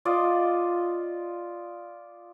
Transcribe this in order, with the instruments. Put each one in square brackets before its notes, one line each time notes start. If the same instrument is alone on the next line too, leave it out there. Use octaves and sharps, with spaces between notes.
[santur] F4 D5 D#5